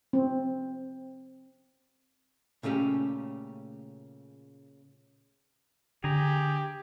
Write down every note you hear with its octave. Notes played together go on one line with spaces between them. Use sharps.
C4
A#2 C#3 A3 C#4 G4
D3 G4 G#4 A#5